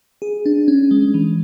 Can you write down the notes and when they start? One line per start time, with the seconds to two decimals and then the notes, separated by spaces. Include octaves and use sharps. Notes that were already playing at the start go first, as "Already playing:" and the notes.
0.22 G#4
0.46 D4
0.68 C#4
0.91 G#3
1.14 E3